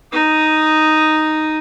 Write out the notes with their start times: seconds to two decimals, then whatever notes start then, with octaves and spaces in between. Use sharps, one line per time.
0.13 D#4 D#6